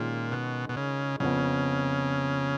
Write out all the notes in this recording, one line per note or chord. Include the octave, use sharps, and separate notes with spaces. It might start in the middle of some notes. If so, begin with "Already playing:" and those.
Already playing: A#2 D#3 G#3 C#4 F4
B2
B2
C#3
F2 C#3 F3 B3